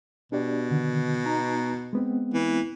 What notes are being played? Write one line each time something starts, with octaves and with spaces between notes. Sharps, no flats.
B2 D4 G4 D5
D3 D#3
B3 D#4 A#5
G#3 B3 C4
E3